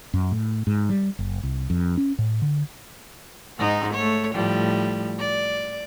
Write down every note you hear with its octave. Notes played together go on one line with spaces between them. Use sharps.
F#2
A2
G#2
G3
F#1
C2
F2
C#4
A2
D3
G#2 G#3 D#4
A3 C#5
A2 F3 G3
D5